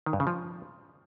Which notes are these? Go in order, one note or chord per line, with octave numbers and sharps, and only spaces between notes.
D#3
G2
C#3
F3